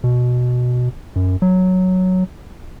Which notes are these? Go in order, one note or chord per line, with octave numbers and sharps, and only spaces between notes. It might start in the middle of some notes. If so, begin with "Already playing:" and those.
B2
F#2
F#3